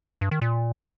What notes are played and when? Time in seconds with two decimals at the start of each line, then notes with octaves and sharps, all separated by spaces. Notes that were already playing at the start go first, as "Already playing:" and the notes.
0.21 G2
0.31 D#3
0.42 A#2